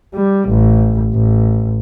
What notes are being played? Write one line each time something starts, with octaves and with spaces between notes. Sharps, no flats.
G3
A1
A1